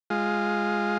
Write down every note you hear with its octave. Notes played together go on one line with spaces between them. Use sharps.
G#3 F4